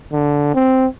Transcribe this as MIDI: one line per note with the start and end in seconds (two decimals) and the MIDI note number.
0.12 0.54 50
0.55 0.86 60